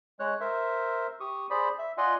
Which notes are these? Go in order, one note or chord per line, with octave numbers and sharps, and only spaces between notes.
G#3 C#5 F#6
A#4 C5 E5
G4 C#6 D#6
G#4 C5 D5 B5
E5
F4 D5 D#5 F#5 G#5 C6